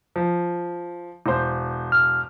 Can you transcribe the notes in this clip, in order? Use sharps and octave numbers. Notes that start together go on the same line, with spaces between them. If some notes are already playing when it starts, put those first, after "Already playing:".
F3
E1 C5
F6